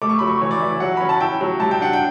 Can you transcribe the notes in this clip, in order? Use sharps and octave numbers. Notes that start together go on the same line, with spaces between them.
A3 D6
C#6
F#3 B5
C#6
E3 C#5
D5
E3 E5
F#3 F#5
C#4 B5
A5
E4 G5
F#3
G3 A5
G5
D4 F#5
G5